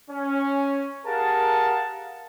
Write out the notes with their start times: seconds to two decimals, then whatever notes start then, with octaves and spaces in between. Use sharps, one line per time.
0.11 C#4
1.07 G4 G#4 A#4 F5 F#5 A5